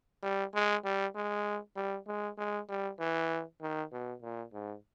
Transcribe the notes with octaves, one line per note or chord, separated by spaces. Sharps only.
G3
G#3
G3
G#3
G3
G#3
G#3
G3
E3
D#3
B2
A#2
G#2